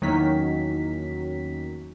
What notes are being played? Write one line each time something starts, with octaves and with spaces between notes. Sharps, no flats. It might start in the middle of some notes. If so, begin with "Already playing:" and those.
E2 D#3 F#3 A#3 C#4 B6